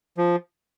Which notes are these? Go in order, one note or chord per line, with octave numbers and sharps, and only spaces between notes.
F3